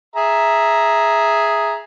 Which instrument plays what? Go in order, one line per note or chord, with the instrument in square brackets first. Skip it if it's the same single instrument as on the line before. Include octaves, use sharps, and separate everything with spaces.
[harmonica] G#4 E5 A#5